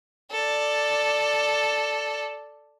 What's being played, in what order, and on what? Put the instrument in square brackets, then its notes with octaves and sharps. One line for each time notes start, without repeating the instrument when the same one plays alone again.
[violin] A4 D5